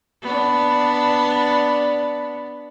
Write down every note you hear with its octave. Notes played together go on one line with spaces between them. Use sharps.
B3 D4